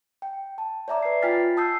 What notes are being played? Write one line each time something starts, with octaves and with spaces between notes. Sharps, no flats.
G5
A5
C#5 D5 E5 A#5 D6
B4 C7
F4 G5 G#5 F6 A6 B6
A5 D#6 E6 G6 C7